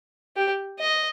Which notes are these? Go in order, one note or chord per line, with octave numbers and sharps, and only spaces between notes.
G4
D#5